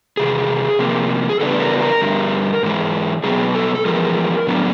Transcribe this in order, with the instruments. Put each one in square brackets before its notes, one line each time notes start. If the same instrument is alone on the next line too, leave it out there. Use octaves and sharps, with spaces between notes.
[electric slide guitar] E2 C3 G#4
C3 F3 A#3
G#4
C#3 E3 G3 B3 D4 A4
A4
A#4
A#4
G2 D3 G3
G#2 E3 G#3
B2 F#3 B3 G#4
A4
A4
E2 C#3 F3 G#3 A#4
A2 F#3 B3 D4